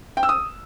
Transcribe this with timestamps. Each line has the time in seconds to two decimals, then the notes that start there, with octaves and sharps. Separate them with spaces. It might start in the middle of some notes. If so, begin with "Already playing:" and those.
0.17 G5
0.23 E6
0.29 D#6